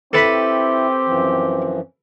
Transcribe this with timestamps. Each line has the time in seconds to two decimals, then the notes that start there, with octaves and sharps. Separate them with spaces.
0.13 C4 E4 G4 A4 B4 B5
1.07 F#2 E3 F3